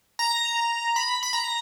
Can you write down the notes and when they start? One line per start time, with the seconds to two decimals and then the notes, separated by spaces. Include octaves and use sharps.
0.19 A#5
0.96 B5
1.23 B5
1.33 A#5